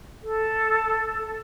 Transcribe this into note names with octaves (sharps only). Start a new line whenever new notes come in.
A4